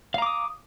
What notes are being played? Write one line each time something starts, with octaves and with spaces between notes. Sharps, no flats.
F5 A#5 D6 D#6